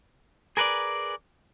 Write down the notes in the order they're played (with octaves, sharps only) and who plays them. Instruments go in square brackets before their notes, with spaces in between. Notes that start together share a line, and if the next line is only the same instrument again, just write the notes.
[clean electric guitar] G#4 A#4 B4 C#5 D5